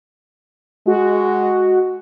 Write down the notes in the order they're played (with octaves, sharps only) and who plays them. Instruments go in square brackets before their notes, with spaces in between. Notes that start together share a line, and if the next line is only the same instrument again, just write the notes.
[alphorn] G#3 [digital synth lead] F#4